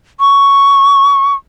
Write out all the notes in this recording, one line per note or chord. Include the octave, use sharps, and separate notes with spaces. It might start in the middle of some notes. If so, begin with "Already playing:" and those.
C#6